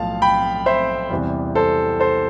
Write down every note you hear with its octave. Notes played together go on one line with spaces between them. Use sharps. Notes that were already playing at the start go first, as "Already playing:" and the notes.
Already playing: B1 A2 F3 F5 A5
G5 B5
C5 E5
E2 C3 E3 G3
A4 C5
A4 C5